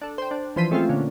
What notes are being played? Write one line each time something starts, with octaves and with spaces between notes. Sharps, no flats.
D4 A4
C5 G5
D4
E3 F3 C5 C6 B6 D#7
G#3 A3 C4 C#4 F4 G#4
A#2 D3 C#4